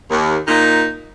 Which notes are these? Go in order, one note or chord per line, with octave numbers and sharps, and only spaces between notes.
D#2
A#2 D#4